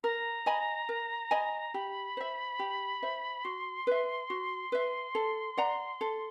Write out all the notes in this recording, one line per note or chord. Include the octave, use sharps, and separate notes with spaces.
A#4 A#5
D#5 G#5 B5
A#4
D#5 G#5 B5
G4 B5
C5 E5
G4
C5 E5
F#4 C6
B4 E5
F#4
B4 E5
A4
D5 F#5 A#5
A4